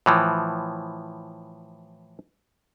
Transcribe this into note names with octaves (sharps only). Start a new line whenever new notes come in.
A2 E3 F3